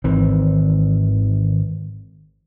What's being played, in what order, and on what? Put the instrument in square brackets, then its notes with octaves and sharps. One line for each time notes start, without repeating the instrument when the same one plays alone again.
[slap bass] G#1 D#3 E3 C4